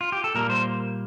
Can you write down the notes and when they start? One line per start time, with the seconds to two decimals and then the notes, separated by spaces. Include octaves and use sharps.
0.01 F4
0.12 G4
0.24 A4
0.35 A#2 G3 A#3 A#4
0.50 C5